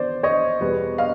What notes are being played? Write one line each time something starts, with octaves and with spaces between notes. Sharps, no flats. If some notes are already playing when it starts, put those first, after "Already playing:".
Already playing: B2 C5 D5
C#5 D#5
E2 B2 G3 B3
D#5 F5